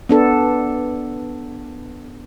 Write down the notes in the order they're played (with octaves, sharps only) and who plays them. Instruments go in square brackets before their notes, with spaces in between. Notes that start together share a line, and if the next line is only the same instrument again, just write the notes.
[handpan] B3 D4 A4